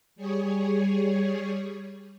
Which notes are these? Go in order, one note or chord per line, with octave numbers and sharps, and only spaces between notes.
G3 G#4 C#5